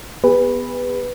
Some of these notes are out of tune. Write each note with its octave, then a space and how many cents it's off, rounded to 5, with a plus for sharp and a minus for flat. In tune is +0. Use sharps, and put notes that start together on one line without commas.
B3 +0 G#4 -40 B4 +0